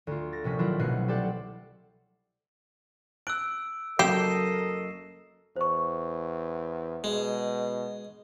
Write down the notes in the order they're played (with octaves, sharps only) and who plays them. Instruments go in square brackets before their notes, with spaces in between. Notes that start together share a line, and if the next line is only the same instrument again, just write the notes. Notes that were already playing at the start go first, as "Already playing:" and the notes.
[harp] D2 F4
A6 A#6
A#1 C3 C#4 B6
D#3 F#3 D4 E4 F4
C2 B2 A3 D#4 F#6 C7
G4 A4 C5 D5 F#5
[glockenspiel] E6 D7 [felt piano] F#6
[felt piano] F#1 F#3 [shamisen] G4 [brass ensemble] A4 A#4 D#5 [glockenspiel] C7 E7
[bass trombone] E2 [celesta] C5 C#6
[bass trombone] B2 [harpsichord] G#3